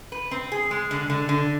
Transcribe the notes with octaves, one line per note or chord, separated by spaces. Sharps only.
B4
C4
G#4
G#3
D3
D3
D3